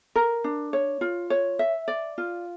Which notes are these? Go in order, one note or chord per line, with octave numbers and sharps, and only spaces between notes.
A#4
D4
C#5
F4
C#5
E5
D5
F4